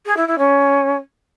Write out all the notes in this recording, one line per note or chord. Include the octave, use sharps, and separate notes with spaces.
G#4
E4
E4
C#4